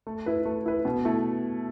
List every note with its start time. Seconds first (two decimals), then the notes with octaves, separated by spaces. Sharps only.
0.07 A3
0.26 E4 B4
0.45 A3
0.66 E4 B4
0.85 B2
1.05 A3 E4